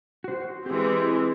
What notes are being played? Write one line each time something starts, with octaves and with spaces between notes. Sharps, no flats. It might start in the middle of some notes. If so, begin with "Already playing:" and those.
F#4 C5
E3 G#3 C4 G4